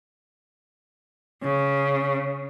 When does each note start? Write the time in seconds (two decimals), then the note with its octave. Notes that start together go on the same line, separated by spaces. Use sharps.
1.43 C#3